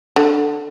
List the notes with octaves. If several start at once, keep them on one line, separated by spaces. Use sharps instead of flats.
D3